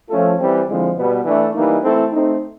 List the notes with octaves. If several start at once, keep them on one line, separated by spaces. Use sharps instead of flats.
F3 A3 C#4 F4 A4
E3 G3 C4
D3 F3 G#3 C4 E4
B2 G3 B3
E3 A3 D4
E3 G3 A#3 D#4
E3 A3 C4 E4 A4
A3 C4 D#4